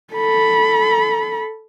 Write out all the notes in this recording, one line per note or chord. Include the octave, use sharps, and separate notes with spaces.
A4 B5